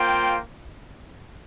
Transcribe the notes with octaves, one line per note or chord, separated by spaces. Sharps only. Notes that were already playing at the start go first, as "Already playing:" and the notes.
Already playing: A#3 F4 C5 G5